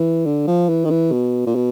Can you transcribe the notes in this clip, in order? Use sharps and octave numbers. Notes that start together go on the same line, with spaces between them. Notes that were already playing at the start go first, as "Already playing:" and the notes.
Already playing: E3
D3
F3
E3
D#3
E3
B2
A#2
B2